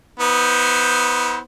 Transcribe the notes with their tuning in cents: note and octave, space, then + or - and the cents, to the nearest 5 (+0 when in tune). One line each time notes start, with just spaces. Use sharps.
B3 +0 E4 -45 C5 +0